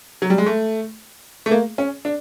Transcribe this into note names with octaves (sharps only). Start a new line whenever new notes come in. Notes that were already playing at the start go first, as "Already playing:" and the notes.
F#3
G3
G#3
A3
A3
A#3
C#4
D4